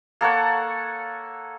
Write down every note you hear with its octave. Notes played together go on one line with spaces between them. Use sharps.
A#3 A4 C#5 F#5